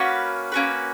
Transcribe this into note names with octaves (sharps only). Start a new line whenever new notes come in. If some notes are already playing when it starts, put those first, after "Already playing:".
Already playing: A#3 C#4 F#4 B4
A#3 C#4 F#4 B4